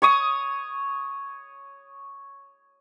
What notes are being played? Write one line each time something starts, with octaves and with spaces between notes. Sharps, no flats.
C#5 C#6 D#6